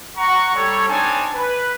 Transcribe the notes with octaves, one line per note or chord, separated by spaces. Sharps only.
F#5 A#5 C#6
G3 A4 C#5
C4 D4 D#4 C#5 G#5 A5
B4